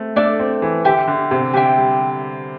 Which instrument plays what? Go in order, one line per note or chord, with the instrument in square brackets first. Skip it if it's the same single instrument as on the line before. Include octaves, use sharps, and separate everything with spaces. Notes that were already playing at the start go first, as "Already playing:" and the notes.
Already playing: [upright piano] A3 C4
[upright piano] A3 [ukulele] D4 A4 D5
[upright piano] C4
E3
[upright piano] D3 [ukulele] G4 E5 G5
[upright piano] D3
C3
[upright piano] D3 [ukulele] G4 E5 G5
[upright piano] G3